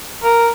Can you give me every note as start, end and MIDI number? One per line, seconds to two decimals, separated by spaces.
0.23 0.50 70